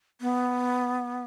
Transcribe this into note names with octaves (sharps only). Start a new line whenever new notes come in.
B3